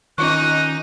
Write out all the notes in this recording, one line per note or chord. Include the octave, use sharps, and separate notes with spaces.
D#3 C#4 D#4 F4 C#6 F#6